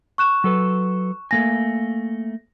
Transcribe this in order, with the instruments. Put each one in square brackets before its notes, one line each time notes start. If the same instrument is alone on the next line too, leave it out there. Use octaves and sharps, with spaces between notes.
[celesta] C#6 F#6 E7
[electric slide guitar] F#3 A4 B4
[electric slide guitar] A3 A#3 G#5 [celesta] A#6